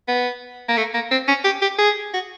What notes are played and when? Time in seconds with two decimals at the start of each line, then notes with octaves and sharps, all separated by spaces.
0.08 B3
0.69 A#3
0.77 A3
0.94 A#3
1.11 C4
1.28 C#4
1.44 G4
1.62 G4
1.78 G#4
2.14 F#4